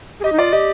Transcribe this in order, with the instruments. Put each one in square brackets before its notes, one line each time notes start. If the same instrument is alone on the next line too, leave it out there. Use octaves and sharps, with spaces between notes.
[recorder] G#4
[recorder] G4 [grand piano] D#5
[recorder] D#4
[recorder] F4 [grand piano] D5
[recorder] G4 [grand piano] D#5